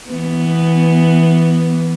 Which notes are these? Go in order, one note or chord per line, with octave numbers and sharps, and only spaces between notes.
E3 B3